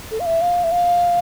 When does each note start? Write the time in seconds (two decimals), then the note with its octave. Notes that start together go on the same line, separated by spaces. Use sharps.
0.11 A4
0.20 F5
0.26 E5
0.41 F5
0.64 E5
0.72 F5